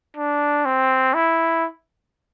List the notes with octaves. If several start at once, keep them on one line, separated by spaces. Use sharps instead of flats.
D4
C4
E4